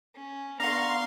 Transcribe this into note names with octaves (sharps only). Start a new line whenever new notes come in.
C#4
B3 D4 F5 F#5 A#5 C6 C#6